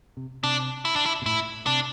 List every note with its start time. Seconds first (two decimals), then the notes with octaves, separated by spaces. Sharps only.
0.17 C3
0.44 C3 D4
0.85 E4
0.96 D4
1.06 E4
1.22 B2
1.26 A2 E4
1.66 C3 D4